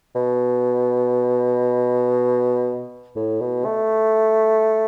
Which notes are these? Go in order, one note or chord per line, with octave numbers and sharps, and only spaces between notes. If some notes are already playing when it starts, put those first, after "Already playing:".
B2
A2
B2
A3